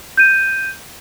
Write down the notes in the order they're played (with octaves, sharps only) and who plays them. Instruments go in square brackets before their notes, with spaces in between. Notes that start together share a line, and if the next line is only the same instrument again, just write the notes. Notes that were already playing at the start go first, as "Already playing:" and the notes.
[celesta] G6 D#7